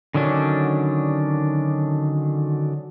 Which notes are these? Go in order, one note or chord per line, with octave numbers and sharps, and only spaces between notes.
D3 D#3 F#3 C#4 D4